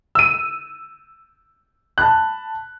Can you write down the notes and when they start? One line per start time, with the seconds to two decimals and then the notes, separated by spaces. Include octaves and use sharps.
0.15 E6 D#7
1.98 A5 B5 F#6